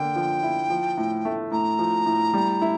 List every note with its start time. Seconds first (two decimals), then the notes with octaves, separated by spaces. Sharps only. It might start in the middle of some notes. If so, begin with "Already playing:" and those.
Already playing: D3 A#3 G5
0.16 F3
0.43 E4
0.70 F3
0.97 A2
1.25 A3
1.51 A2 A#5
1.79 F3
2.06 A2
2.33 G3
2.62 E4